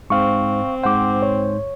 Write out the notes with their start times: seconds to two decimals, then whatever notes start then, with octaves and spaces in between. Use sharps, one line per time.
0.10 G#2 C4 F5 C#6
0.83 G#2 C5 F#5 D6
1.22 C#5